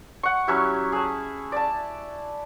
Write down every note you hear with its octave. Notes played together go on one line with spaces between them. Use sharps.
F#5 C#6
F#3 C#4 E4 G4
G#4 A5
D5 A5